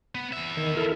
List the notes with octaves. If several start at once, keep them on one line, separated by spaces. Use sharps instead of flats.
B3
E2 E5
D#3
E4 A4 A#4